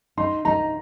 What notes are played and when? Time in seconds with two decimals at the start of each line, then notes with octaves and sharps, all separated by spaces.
0.17 D#4 C6
0.45 D#4 A#5